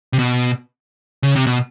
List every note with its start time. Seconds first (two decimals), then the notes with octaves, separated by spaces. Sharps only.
0.13 C3
0.19 B2
1.23 C#3
1.36 C3
1.47 B2